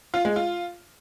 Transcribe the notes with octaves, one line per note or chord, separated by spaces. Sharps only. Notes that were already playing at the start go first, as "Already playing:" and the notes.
F4
G#3
F4